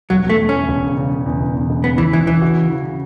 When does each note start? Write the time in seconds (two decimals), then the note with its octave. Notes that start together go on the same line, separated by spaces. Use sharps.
0.10 E1 F#3
0.25 E2 A3
0.39 E2
0.49 C#4
0.54 E2
0.68 E1
0.83 C#3
0.97 C#3
1.12 C#3
1.26 E2
1.40 E1
1.54 E2
1.69 E1
1.84 C#3 B3
1.98 E1 E3
2.13 E2 E3
2.27 E1 E3
2.41 F#4
2.56 C#3
2.71 C#3
2.86 C#3